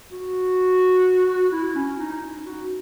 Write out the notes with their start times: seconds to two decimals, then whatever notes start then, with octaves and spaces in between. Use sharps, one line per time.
0.11 F#4
1.52 E4
1.75 C#4
1.99 D#4
2.46 F#4